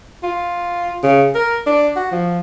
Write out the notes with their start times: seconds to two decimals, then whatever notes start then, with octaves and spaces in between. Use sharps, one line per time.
0.23 F4
1.03 C#3
1.35 A#4
1.67 D4
1.96 F#4
2.12 F3